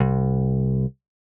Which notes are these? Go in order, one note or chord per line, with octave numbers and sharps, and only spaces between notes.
C2